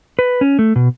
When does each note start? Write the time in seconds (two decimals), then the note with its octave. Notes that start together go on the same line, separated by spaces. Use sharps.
0.19 B4
0.41 C#4
0.59 A3
0.76 B2